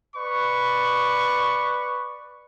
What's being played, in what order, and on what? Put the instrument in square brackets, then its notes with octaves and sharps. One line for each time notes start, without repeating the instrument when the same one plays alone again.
[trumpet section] B4 D5 C#6